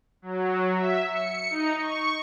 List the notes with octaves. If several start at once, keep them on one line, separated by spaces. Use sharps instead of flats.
F#3
E5
C#7
D#4
C#6